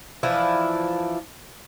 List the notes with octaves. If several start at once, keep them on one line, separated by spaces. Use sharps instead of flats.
E3 F3 D4 E4